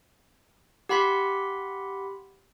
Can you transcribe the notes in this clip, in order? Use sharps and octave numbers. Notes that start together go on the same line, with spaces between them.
G4 F#5 B5 C6 B6